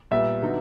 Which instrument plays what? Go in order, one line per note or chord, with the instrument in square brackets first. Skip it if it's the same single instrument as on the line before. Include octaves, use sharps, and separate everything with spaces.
[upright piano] A#2 G3 B3 [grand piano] E5
[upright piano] D3 F#3 B3 D#4